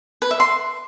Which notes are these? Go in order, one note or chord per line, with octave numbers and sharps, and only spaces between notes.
B4
E5
C6